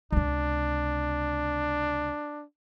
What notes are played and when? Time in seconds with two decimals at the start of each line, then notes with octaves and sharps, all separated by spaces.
0.12 C#2 C3 D4